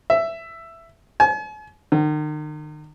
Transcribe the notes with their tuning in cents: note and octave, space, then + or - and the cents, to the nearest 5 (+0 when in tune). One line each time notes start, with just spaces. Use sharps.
E5 +10
G#5 +45
D#3 -40